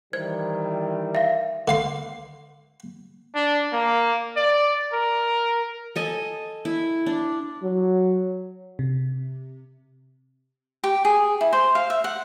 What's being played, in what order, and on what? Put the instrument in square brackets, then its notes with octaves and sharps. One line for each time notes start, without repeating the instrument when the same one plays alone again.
[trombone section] D#3 E3 G3 [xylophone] C5 G#6
[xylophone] E5 F5
[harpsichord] D3 F5 C6
[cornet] D4
A#3
D5
A#4
[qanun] A4 D#5 G#5
E4
D4
[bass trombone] F#3
[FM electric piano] C3
[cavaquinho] G4
G#4
E4
C5
F5
E5
F#5